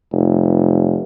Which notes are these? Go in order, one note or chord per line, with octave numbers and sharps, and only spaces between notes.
F1